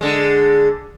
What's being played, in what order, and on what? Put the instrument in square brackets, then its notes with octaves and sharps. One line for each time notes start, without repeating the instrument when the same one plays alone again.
[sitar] D3 G#3